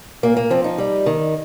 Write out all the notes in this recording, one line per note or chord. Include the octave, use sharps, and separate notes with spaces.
A#2 A#3
A#3
F3 C4
D#4
G3
D#3